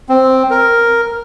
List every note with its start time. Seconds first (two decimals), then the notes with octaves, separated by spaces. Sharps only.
0.09 C4
0.51 A#4